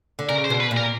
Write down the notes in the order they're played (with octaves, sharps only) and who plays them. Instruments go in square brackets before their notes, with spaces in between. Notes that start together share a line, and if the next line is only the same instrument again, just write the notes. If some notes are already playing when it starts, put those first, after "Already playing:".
[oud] D3
[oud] C#3 [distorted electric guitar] A#4
[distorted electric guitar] C5
[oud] B2
[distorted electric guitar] B4
[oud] A#2
[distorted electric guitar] A#4